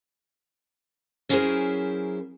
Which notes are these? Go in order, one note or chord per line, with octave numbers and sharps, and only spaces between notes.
F#3 C#4 E4 G#4 A#4 C5